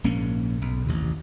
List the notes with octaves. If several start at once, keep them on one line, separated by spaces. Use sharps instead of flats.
A#1 G#2 A#3 C#4
B1
A1 D#2 C3